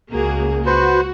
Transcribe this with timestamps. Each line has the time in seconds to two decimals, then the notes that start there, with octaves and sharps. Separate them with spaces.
0.11 C#2 A#3 F#4 G#4
0.66 F#4 B4 C5